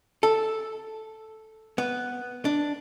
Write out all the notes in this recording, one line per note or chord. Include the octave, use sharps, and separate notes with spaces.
A4
B3
D4